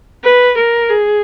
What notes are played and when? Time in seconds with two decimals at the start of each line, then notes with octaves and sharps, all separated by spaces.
0.23 B4
0.57 A#4
0.89 G#4